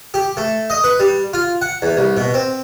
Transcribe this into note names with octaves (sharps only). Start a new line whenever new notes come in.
G4
A3
D#5
B4
G3
F4
F#5
E2
C2
B2
C4